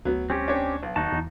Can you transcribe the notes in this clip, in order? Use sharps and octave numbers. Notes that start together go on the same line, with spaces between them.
D2 F#3 B3
G3 C4 C#4 G4
D4 C#5
B1
D#2 D#4 F#4 A5
E2